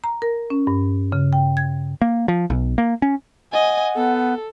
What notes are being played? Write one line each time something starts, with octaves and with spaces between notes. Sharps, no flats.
A#5
A#4
C#4
G2
C#3
G5
G#6
A#3
F3
B1
A#3
C#4
D#5 F#5 G#5
B3 A4